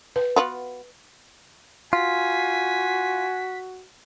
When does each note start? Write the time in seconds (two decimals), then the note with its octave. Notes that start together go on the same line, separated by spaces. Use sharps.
0.16 B4
0.36 B3 F4 F#4
1.93 F4 F#4 G#5 B6